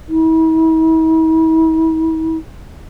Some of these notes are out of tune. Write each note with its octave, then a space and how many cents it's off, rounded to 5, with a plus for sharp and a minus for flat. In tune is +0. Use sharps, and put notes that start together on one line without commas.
E4 -45